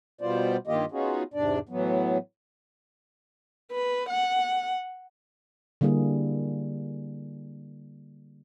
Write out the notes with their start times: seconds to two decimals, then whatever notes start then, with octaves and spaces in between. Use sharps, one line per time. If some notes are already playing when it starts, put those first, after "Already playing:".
0.21 B2 G3 B3 F4 C5 D5
0.67 G2 D#3 A#3 F4 G4 D#5
0.92 B3 C#4 D#4 F4 F#4 G#4
1.34 E2 G#2 C3 D4 D5
1.69 A2 E3 F#3 B3
3.72 B4
4.10 F#5
5.81 D3 G3 A#3 E4 G#4